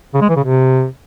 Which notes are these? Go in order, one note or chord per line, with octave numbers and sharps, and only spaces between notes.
C#3
G#3
E3
C#3
C3